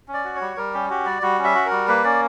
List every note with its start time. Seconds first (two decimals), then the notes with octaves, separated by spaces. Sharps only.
0.08 C#4
0.14 D5
0.24 F#4
0.36 C#5
0.41 G3
0.57 G3 A#4
0.74 C#4 G4
0.90 F#4 G4
1.06 G3 D5
1.22 G3 F#4
1.39 C#4
1.44 E5
1.55 F#4
1.66 A#4
1.71 G3
1.88 A#3 B4
2.04 C#4 D5